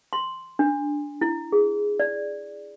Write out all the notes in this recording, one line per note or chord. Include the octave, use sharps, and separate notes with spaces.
C6
D4
E4
G#4
D5